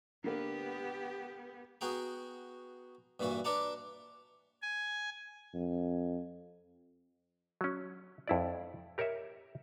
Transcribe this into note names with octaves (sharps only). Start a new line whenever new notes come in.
D3 A#3 B3 G4 B4
B3 F#4 G#4 G5 A#5
G2 A#2 E3 F#4 B5
D4 B4 D5 F#5 A5 A#5
G#5
F2
F#3 C#4
F2 E4 D5
G4 A#4 C#5 D#5 E5